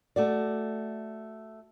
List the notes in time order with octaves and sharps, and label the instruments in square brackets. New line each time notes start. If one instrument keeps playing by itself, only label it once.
[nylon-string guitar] A3 F#4 D5